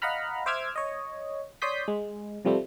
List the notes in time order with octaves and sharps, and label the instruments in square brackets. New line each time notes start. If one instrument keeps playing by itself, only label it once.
[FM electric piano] D#5 F5 F#5 A#5 B5 F6
C5 E5 D6 E6 F6 G#6
C#5 D#5
C#5 D5 C6 D#6 G6 B6
G#3
C3 F3 G3 A3 C4